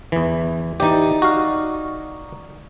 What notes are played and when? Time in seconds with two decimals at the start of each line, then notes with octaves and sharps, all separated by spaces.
0.12 E2 E3
0.80 E3 D#4 G4 D5
1.22 F#4 F5